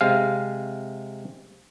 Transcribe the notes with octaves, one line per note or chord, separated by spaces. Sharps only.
C3 G#3 F5